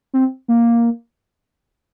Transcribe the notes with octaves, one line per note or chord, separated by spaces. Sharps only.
C4
A#3